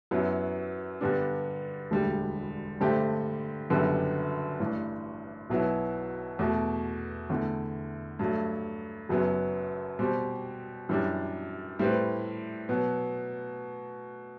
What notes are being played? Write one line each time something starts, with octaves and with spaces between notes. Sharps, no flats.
F#2 F#3 B3 E4
G2 D3 G3 B3 D4
E1 D2 D3 G3
G2 D3 A3 C4 G4
F#1 F#2 D3 G3 B3
A1 G2 E3
B1 B2 F#3 B3 E4
E2 B2 A3
E2 D3 A3 E4
G2 F#3 A3
F#1 F#2 F#3 B3
B2 G3 C4 G4
F#2 E3 G3 D4
A2 G3 C4 E4 B4
B2 F#3 B3